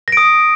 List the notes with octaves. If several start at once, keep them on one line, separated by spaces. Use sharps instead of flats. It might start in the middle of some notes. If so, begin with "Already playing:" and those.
D#6 A#6 D7